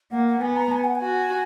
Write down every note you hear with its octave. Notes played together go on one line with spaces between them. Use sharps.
A#3 F#5
F#5
B3 G#5
A#5
G#5
F#5
G#5
F#4